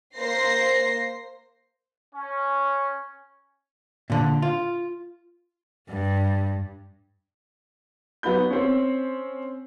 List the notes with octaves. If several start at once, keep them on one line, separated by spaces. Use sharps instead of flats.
A#3 C5 A#6 C7
C#4
A#2 D3
F4
G2
F#3 B3 D#4 B5 G6
C4 C#4